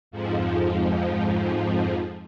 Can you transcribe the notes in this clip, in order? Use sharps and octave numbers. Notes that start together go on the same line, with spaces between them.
F2 G#2 F3